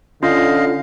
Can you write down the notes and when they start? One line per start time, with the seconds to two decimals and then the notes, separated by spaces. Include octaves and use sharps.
0.23 D3 C#4 F4 D#5 F5